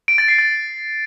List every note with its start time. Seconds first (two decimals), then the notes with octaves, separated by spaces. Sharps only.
0.08 D7
0.18 A6
0.28 C7
0.39 A6